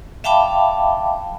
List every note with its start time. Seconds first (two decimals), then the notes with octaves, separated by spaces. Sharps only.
0.24 E5 F5 G5 A5 B5 D6